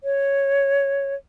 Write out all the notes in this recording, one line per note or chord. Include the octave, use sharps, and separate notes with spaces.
C#5